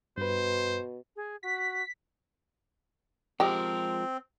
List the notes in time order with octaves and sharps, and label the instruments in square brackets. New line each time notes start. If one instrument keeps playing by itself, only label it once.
[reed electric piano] G2 B4 [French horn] B2 [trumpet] C5
[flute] G#4
[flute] F#4 [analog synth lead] B6
[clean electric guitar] F3 G#3 A#4 [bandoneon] C4 [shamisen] F#4 G4 D#5